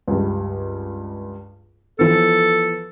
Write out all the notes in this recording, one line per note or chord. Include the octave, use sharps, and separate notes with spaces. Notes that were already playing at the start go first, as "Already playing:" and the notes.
C#2 G2
E3 F3 B3 A4